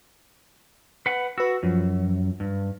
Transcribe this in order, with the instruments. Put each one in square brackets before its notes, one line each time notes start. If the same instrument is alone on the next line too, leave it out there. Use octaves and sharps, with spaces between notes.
[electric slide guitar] B4 F#5
[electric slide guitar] F#4 [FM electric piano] B4 E6
[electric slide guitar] F#2 [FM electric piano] F3
[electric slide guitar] G2